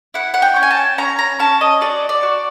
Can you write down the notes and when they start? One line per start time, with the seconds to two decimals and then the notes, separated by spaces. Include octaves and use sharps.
0.14 E4 F#5
0.34 F#5
0.42 G5
0.56 C#4
0.63 G#5
0.71 A5
0.98 C#4 A#5
1.19 A#5
1.39 C#4 A5
1.61 D#5
1.81 F#4 D5
2.09 D5
2.23 F#4